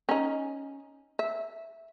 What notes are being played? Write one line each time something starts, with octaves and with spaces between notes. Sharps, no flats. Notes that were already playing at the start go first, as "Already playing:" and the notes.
C#4 D#4
E5